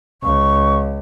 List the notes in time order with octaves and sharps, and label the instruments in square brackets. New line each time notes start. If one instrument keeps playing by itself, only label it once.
[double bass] C#2 [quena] C#6